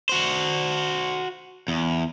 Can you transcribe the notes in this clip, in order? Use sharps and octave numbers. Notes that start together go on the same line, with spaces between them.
F#4 C5
E2